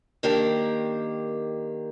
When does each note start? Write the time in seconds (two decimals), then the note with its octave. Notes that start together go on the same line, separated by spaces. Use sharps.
0.23 D#3 A#3 D4 G4 A#4